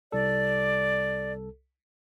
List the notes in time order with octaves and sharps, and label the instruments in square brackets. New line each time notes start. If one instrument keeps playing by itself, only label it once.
[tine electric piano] C2 A4 [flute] D5